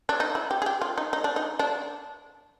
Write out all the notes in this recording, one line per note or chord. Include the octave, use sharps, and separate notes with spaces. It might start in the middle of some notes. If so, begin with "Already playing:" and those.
D4
D#4
E4
G4
G#4
G4
F4
D#4
D#4
D4
D#4
D4